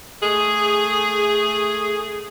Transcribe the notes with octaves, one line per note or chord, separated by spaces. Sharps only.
A3 G#4